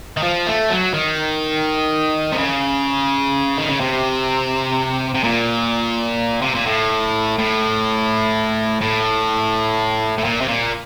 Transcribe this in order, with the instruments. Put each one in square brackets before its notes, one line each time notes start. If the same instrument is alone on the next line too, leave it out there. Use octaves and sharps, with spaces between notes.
[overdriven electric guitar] D#3
F3
A3
F#3
D#3
C3
C#3
D#3
C#3
C3
C3
A#2
C3
A#2
A2
A2
A2
A2
A#2
C3
A#2